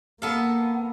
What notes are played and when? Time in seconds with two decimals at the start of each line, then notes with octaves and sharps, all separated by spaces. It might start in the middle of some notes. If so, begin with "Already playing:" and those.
0.22 A#3 B3 A4 F5